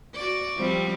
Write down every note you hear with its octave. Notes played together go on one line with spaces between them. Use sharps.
F#4 D5
F3 G3 C4